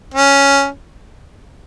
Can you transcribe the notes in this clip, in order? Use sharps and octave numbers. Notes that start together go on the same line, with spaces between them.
C#4